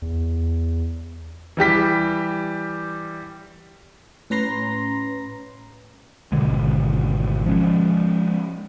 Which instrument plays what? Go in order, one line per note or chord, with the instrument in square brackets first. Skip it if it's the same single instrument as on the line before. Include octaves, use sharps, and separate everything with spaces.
[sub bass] E2
[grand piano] E3 G3 G4 B6
[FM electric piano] A2 C#4 B4 A#5 C6 A#6
[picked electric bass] G#1 B2 D3 G#3
F3 G#3 C#4